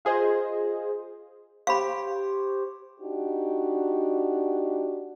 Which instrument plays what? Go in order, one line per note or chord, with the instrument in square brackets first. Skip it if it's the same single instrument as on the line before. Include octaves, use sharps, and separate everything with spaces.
[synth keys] F4 G#4 C5 D#5
[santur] G4 C5 C#5 [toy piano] F5 B5
[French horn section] D4 D#4 F#4 G4